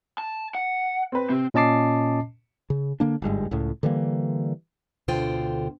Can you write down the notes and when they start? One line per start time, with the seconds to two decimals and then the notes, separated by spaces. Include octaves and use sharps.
0.18 A5
0.55 F#5
1.12 C4 B4
1.30 C3 C4
1.54 A#2 C#4 D#5 A5 D6 C7
2.70 C#3
3.00 D3 A#3 D4
3.22 G1 G#2 G3 G#3
3.51 C#2 A2
3.83 D3 E3 G3 A#3
5.08 D2 B2 D3 F4 C5 G5